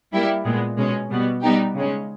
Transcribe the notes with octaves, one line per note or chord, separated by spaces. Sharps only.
G3 A#3 E4 G4
A#2 G#3 B3
B2 G#3 C#4
B2 G3 B3
G3 B3 D#4 G4
C#3 G#3 C#4